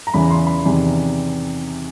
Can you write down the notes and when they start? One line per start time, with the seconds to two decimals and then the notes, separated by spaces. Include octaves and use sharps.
0.07 A#5
0.14 E2 C#3 E3 B5
0.30 C6
0.47 B5
0.64 E2 C3 D#3